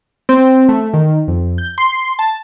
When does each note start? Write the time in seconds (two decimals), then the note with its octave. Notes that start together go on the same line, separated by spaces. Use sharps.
0.29 C4
0.69 A3
0.93 D#3
1.28 F2
1.58 G6
1.78 C6
2.19 A5